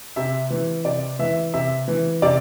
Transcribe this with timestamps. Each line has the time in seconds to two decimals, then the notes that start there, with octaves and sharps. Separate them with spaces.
0.16 C3 E5
0.50 E3
0.85 C3 D5
1.19 E3 E5
1.53 C3 E5
1.88 E3
2.22 C3 D5